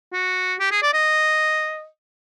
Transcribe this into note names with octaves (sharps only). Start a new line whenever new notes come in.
F#4
G4
G#4
D5
D#5